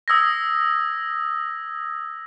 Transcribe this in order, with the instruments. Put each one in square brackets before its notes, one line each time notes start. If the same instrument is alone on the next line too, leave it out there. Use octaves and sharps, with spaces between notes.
[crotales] D#6 E6 G#6 A#6